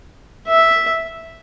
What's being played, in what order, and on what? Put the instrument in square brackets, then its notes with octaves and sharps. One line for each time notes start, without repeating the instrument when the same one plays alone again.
[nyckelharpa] E5